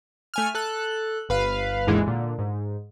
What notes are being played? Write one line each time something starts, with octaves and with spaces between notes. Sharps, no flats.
A3 G#5 F6
A4 F#6
G1 B4 F5
G#1 D#2 G#2 D3 E3 G#3
A#2 D3
G#2